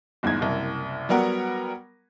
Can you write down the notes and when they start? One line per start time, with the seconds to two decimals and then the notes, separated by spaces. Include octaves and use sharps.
0.23 G1 E2 G#2 G#6
0.41 F#1 C2
1.09 F#3 G3 B3 A#4 F#5